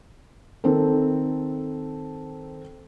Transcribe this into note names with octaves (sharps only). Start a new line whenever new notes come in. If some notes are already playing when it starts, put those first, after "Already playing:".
D#3 C4 A4